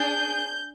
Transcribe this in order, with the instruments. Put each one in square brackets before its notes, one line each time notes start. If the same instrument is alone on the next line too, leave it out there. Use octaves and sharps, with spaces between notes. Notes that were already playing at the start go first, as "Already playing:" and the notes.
Already playing: [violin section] D4 G#4 G6